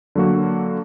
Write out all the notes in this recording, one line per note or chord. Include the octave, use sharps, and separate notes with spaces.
D3 F#3 A#3 F#4